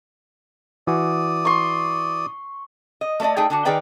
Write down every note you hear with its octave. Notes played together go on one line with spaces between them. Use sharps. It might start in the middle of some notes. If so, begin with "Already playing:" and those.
E3 F#4 D5 G#5 D#6
C6 C#6
D#5
A3 A4 B4 D5 D#5
A3 D#4 G#4 G5
D3 D4 F#4
D#3 G#4 B4 D5 G5 A#5